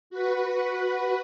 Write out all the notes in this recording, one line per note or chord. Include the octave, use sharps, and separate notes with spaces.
F#4 B4